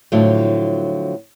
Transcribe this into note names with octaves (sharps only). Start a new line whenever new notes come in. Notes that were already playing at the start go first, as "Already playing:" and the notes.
A2 D3 F3 F#3